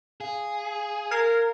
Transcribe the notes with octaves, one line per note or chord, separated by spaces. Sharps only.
G#4 F5
A#4 F6 G#6 C7